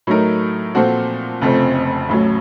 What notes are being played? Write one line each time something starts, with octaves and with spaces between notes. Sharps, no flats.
A2 F#3 A3 D#4 A#4
A#2 F3 C4 F#4 A4
F1 F2 C#3 A3 C4
A1 A2 F#3